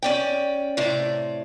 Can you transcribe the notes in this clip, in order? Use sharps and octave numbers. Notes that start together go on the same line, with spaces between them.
C#4 D5 G5
A2 C3 D5